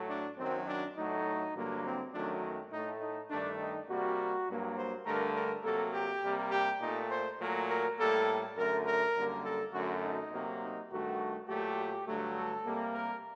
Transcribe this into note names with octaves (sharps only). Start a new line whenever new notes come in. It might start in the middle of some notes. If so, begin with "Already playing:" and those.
Already playing: A2 F#3 A3
D4
F#2 D#3 F#3 C4
D4
A2 F#3 A3 D#4
G2 D3 F#3 A#3
C4
F#2 D#3 F#3 A3 D4
A2 A3 D#4
D#4
G2 D#3 A3 D4
D#4
C3 G3 A#3 F#4
G2 F#3 A#3
C5
G2 D3 A3 A#4
A#4
C3 F#3 A#3 A4
G4
C3 G3 A#3
G4
A#2 A3 D#4
C5
A#2 F#3 A3 A#4
A#4
A2 G3 A#3 A4
F#2 D3 A3 A#4
A#4
F#2 D3 G3 A#3
A4
F#2 D3 A3 F#4
D#4
C3 F#3 A#3
D#4
G2 D#3 A3 F#4
A#2 F#3 A3 G4
G2 D3 F#3 A3
A4
C3 G3 A#3
A#4